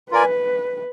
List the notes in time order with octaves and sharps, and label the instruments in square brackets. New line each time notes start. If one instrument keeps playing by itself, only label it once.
[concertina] F4 A#4 D5 G#5 [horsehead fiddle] B4